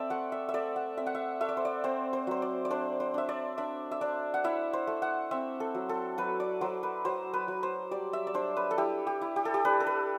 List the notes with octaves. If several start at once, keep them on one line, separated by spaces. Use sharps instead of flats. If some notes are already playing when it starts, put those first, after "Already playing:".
Already playing: C4 A4 D5 E5
A3 F#5
E5
E5
A3 D5
F#5
C4 E5
F#5
E5
A3 E5
D5
C5
D5
C4 C5
C5
F#3 C5
D5
D5
D4 C5
C5
D4 E5
D5
D4 E5
E5
D4 D5
F#5
E4 E5
C5
A3
F#5
C4 E5
A4
F#3
A4
F#3 B4
D5
F#3 C5
B4
F#3 C5
B4
F#3
C5
G3 D5
E5
D5
D4 C5
B4
A4
E4 G4
G4
E4
G4
A4
G4
D4 B4
A4
B4